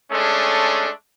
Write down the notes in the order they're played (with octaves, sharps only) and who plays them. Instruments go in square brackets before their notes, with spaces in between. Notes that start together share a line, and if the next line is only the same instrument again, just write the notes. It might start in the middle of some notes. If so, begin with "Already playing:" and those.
[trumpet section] G#3 A3 C#4 D4 A4